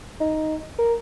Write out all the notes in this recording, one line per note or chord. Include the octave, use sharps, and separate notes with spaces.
D#4
A#4